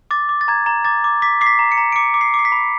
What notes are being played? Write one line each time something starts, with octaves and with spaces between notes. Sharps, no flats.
D6 A6
D6
A6
A#5 G#6
A#5
D6 A6
D6
D6 B6
D6 C7
B6
A#5
C#7
A#5
D7
D6 C#7
D6
C7
D6
C7
B6
B5